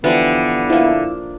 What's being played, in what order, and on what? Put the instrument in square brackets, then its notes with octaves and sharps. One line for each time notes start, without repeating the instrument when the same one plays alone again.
[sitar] D3 [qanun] E3 F3 G3 [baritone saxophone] B3
[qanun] F3 A#3 [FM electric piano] E4 E5 F5